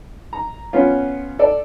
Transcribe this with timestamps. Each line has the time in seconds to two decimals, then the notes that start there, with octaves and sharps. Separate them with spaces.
0.33 A#5
0.73 B3 C#4 F4
1.39 A4 D5